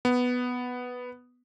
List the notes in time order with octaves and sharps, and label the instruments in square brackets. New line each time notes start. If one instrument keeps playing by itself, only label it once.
[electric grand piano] B3